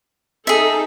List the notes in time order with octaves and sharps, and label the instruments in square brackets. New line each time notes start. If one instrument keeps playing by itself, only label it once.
[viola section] D#4 A4 [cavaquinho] G#4 E5